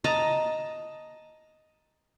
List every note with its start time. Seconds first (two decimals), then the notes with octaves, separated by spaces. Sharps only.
0.04 D#5 A5 A#5